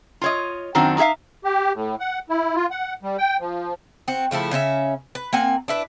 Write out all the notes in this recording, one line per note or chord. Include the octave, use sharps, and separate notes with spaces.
F4 C#5 D#5
F#2 D#3 C4 D4 F#4
D#4 F#4 G#4 E5 F5
G4
A2
F#5
E4
F4
F#5
G3
G5
F3
C4 F#4
C#3 F3 A3 E4
C#3 C#4 F4 E5
B4
A#3 C4 F#5 G#5
D4 E4 B4